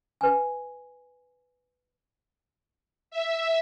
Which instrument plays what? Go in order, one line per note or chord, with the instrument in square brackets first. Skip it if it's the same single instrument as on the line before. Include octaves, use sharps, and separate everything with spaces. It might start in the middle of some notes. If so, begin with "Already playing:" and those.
[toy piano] B4 G#5
[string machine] E5